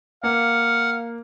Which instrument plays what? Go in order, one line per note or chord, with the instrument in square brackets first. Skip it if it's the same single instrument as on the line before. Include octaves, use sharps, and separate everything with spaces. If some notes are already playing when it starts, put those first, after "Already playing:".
[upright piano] A#3 [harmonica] F5 [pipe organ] F#5